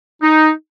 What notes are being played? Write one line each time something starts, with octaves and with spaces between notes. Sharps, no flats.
D#4